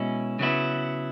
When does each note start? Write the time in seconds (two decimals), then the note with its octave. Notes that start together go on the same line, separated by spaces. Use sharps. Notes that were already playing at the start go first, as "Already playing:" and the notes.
Already playing: B2 G#3 C#4 E4
0.39 C#3 F#3 B3 E4